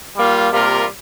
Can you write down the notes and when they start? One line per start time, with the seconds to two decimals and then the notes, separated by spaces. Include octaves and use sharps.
0.17 G3 A#3 F4
0.52 C3 G3 A#3 F4 A#4